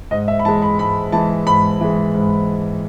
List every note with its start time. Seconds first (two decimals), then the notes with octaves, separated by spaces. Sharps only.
0.11 G#2 D#5
0.28 E5
0.39 B5
0.45 E3 G#3 A5
0.62 B5
0.79 G#2 B5
1.12 E3 G#3 A5
1.47 G#2 B5
1.81 E3 G#3
2.14 G#2